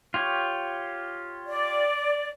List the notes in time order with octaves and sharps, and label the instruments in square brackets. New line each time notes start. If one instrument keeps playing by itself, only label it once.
[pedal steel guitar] F4 G4 C#5
[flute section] D5